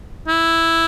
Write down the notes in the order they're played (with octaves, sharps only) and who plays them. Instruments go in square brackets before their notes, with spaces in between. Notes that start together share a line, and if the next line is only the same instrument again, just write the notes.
[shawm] E4